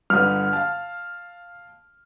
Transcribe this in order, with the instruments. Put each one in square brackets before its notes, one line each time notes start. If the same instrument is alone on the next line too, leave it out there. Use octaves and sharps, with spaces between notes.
[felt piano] G1 D3 D#6 [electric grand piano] F6
[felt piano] F5 A5